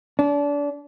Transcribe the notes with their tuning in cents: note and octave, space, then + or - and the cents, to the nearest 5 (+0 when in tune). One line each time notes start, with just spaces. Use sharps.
D4 -30